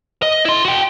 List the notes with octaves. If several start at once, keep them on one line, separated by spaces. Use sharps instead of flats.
D#5
E4 C6
F#4 G5